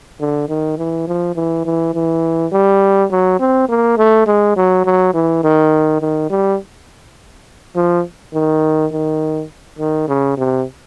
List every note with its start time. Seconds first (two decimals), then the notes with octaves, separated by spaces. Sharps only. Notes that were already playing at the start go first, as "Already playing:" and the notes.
0.20 D3
0.49 D#3
0.78 E3
1.07 F3
1.36 E3
1.65 E3
1.94 E3
2.52 G3
3.11 F#3
3.40 C4
3.69 A#3
3.98 A3
4.27 G#3
4.56 F#3
4.85 F#3
5.14 E3
5.43 D#3
6.01 D#3
6.30 G3
7.76 F3
8.34 D#3
8.92 D#3
9.79 D#3
10.08 C#3
10.37 C3